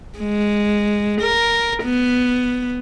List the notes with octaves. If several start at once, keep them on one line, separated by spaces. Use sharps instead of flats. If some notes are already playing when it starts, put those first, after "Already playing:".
G#3
A#4
B3